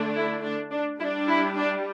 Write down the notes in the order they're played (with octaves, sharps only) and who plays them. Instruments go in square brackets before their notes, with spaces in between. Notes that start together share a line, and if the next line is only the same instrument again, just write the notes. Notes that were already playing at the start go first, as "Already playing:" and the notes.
Already playing: [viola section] D3 A3 D4
E4
D4
D4
G3 D4 E4
E4
D4